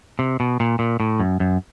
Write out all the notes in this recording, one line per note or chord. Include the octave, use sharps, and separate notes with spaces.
C3
B2
A#2
A#2
A2
F#2
F#2